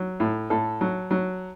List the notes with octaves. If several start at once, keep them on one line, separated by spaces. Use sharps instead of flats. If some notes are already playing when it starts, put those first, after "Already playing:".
Already playing: F#3
A2
A2 A4
F#3
F#3